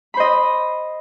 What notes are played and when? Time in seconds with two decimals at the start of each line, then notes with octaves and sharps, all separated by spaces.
0.14 B5
0.17 C5
0.20 D#5